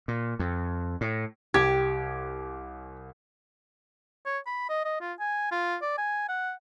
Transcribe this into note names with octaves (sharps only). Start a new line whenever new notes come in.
A#2
F2
A2
C2 G4 D6 G#6
C#5
B5
D#5
D#5
F4
G#5
F4
D5
G#5
F#5